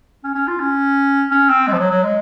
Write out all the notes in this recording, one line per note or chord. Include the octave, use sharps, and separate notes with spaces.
C#4
C#4
F4
C#4
C#4
C4
G#3
F3
F#3
F#3
G#3